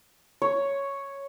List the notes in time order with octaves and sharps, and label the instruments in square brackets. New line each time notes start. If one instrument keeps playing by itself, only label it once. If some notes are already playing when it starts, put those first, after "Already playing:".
[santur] C#5